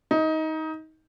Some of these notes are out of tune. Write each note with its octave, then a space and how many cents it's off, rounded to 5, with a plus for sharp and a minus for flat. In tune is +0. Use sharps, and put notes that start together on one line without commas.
D#4 +20